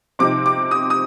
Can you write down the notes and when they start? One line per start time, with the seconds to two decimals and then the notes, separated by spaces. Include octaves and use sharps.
0.19 C3 F3 C4 D#4 D6
0.46 D6
0.71 D#6
0.90 D#6